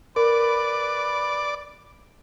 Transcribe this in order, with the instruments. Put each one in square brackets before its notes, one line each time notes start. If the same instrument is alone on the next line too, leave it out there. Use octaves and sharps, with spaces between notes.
[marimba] A#4 [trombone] B4 [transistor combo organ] D5